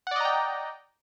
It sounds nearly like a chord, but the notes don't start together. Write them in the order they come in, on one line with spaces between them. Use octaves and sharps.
F#5 D5 D#5 A#5 G5